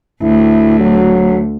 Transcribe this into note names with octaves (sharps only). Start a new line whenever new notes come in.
D2 E4
F#3